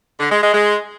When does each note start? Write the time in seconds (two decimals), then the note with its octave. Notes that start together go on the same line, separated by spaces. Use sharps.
0.20 D3
0.31 G#3
0.43 G#3
0.54 G#3